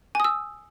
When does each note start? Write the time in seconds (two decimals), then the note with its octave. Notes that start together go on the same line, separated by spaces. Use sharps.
0.15 G#5
0.20 D#6
0.24 E6